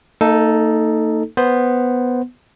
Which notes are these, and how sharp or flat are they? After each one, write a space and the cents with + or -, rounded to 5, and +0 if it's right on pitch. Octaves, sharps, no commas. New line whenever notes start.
A#3 -45 D#4 +0 A4 +0
B3 +0 C5 +0